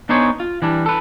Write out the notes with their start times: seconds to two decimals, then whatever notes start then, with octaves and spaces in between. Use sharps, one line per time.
0.09 B3 D4 D#4 G#4 C5 C#5
0.40 F4
0.62 E3 G3 D4
0.86 A4 B4